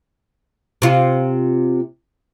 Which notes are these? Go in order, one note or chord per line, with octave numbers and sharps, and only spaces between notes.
C3 F4